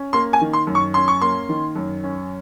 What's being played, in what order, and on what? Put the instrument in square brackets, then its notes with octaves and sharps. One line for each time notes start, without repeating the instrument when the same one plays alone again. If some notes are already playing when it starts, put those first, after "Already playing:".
Already playing: [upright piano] C#4
A#3 C6
G#5
D#3
C6
F#2
C#6
C#4 C6
C#6
A#3 C6
D#3
F#2
C#4